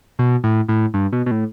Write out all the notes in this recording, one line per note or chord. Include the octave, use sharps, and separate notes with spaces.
B2
A2
A2
G2
B2
B2
A2